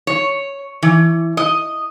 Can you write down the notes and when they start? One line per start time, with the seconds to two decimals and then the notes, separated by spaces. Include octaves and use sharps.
0.07 C#5
0.83 E3
1.37 D#5